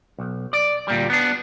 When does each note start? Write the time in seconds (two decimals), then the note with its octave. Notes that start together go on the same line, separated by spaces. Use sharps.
0.19 B1
0.53 D5
0.88 D2 A#2 G3
1.10 B3 D4